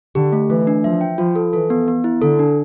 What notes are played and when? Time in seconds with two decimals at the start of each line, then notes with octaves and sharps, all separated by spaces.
0.15 D3 G4
0.33 A3
0.50 E3 A3
0.67 D4
0.84 F3 E5
1.01 G5
1.18 F3 F4
1.36 A4
1.53 E3 A4
1.70 B3
1.88 B3
2.04 E4
2.22 D3 A4
2.39 D4